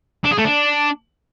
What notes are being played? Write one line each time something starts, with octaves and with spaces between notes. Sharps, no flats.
D4
G#4
A3
D4